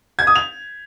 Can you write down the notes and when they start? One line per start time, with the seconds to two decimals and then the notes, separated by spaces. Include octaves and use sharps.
0.19 G#6
0.27 D#6
0.36 F7